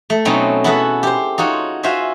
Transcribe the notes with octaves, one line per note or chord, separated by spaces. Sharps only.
A3
B2 F#3 C4 C#4 D#4 B4
B3 E4 F#4 G#4 A4 B4
G4 C5
D#4 F4 F#4 C#5
F4 F#4 C5 E5 G#5